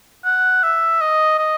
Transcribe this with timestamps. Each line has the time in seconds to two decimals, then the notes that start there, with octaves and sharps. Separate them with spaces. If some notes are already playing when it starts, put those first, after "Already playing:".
0.25 F#5
0.63 E5
1.01 D#5
1.39 D#5